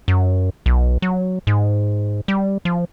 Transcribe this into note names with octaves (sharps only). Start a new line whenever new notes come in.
F#2
B1
F#3
G#2
G3
F3